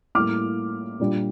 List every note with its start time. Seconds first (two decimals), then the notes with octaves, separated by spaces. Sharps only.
0.15 A2 G3 A#3 D6 F6
1.00 A#2 G3 D4